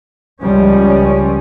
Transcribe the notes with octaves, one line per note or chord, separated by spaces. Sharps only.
C#2 F3 G3 C#4